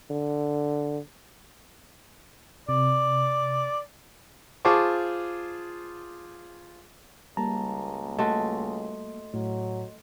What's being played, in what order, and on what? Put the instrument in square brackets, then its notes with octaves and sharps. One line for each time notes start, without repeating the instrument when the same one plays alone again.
[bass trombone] D3
[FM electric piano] C3 [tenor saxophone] D5
[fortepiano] F4 G#4 C5 A5 C#6 D6
[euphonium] C#2 [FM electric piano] G3 A#3 [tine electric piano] A5 A#5
[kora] A3 F#4 [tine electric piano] D#5 C6
[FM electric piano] A2 [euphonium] F#3